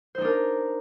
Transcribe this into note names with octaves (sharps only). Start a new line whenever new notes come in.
D4 D#4 A#4 C5